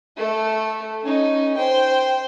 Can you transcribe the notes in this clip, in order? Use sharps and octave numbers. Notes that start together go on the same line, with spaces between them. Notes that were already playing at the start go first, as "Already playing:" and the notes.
A3 A4
C#4 D#4
C5 G5